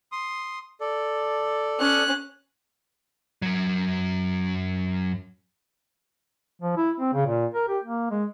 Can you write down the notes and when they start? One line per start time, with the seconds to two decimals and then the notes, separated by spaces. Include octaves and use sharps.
0.12 C6 D#6
0.81 A4 D5
1.80 C#4 F#6
3.42 F#2 F#3
6.61 F3
6.77 E4
7.00 C4
7.13 C#3
7.27 A#2
7.54 A#4
7.68 G4
7.84 A#3
8.11 G#3